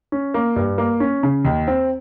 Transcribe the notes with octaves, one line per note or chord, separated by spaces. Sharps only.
C#4
A#3
G2
A#3
C#4
C#3
D#2
C4